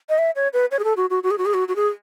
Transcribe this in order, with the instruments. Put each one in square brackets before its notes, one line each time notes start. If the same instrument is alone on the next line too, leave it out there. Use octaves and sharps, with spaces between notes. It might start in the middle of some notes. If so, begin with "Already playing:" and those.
[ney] D#5
E5
C#5
B4
C#5
G#4
A4
F#4
F#4
F#4
G#4
F#4
G#4
F#4
F#4
G#4